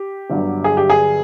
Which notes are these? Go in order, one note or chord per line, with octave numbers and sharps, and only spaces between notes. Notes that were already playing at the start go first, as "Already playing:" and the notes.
Already playing: G4
G1 G2 D3 F#3
G#4
G4
G#4